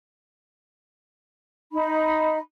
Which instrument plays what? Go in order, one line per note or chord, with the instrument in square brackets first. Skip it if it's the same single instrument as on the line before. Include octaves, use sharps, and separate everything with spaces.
[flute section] D#4 B5